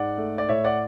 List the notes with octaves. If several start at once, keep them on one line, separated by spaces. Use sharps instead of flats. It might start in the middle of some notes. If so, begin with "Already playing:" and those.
Already playing: G#2 G#3 D5 F#5
A3
D5
A2 C#5 E5
D5 F#5